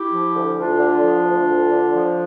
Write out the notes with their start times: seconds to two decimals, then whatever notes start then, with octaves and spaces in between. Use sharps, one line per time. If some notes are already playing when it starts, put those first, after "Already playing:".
Already playing: E4 G4
0.11 F3
0.33 D2
0.57 D2 D4 F4
0.79 D3
1.03 F3
1.25 D2
1.48 D2
1.71 D3
1.94 F3